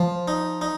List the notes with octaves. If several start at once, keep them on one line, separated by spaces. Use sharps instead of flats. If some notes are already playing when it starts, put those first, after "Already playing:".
Already playing: F3
D#4
D#4